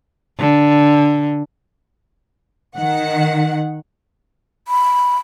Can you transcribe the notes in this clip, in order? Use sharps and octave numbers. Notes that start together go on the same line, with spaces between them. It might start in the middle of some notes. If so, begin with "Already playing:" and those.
D3
D#3 F#5
B5